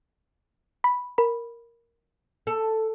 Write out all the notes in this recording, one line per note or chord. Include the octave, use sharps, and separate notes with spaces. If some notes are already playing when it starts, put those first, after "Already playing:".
B5
A#4 B5
A4